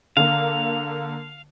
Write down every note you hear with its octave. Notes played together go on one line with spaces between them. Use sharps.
D3 A#3 F5